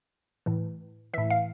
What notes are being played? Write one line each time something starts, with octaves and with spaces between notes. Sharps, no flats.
A2 E3
A2 E3 E5
F5